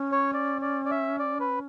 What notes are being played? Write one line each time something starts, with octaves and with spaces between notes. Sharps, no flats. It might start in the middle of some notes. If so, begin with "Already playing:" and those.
Already playing: C#4
C#5
D5
D5
D5
E5
D5
B4